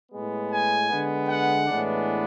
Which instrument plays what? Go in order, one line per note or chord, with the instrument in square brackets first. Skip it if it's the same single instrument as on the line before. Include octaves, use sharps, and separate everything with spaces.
[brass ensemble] A2 G#3 B3
G#5
D3 G#3 B3
F#5
A2 E3 G#3 B3 D4